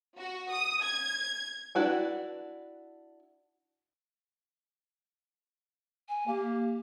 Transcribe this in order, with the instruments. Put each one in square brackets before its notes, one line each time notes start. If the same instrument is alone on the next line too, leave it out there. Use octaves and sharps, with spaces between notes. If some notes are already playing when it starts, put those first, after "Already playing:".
[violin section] F#4
D#6
G#6
[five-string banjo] D4 E4 F#4 B4 G5
[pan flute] G#5
[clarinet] A#3 [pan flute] G4